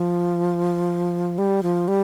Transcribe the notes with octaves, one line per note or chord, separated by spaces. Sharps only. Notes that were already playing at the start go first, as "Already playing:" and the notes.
Already playing: F3
G3
F3
G3